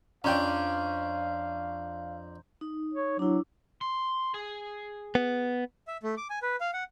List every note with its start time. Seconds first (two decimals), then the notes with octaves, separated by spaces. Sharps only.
0.24 F2 C#4 D4 F5 G5 A#5 C6 G6
2.61 D#4
2.93 C#5
3.19 F#3 D4 E4
3.81 C6
4.34 G#4
5.15 B3
5.87 E5
6.03 A3
6.17 D6
6.30 G#5
6.42 B4
6.60 F5
6.73 F#5